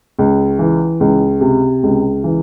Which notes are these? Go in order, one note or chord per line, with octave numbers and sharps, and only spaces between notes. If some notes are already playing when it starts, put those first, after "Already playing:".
C#2
E3
C#2
C3
C#2
E3